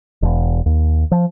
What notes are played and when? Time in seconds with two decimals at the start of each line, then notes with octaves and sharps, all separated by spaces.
0.23 E1
0.66 D#2
1.11 F3